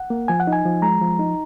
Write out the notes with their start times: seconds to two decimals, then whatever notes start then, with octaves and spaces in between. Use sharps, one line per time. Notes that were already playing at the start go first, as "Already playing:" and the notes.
Already playing: F#5
0.10 A#3
0.28 F3 G#5
0.40 F#5
0.47 D#4
0.53 G#5
0.65 F3
0.82 G#3 A#5
1.01 F3
1.19 D#4